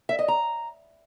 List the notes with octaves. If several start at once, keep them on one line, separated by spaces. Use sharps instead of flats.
E5
D#5
A#5